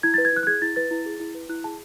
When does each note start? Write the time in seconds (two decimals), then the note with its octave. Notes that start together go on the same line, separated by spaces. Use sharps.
0.03 E4 G#6
0.14 B4 A6
0.25 G#6
0.33 E4 F#6
0.43 F#6
0.47 G#4 G#6
0.62 E4 A6
0.76 B4 A6
0.91 E4
1.06 G#4
1.20 E4
1.35 B4
1.49 E4 F#6
1.64 G#4 A5